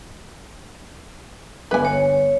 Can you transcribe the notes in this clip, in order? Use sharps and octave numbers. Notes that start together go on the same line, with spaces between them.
G1 B4 G#5
C#5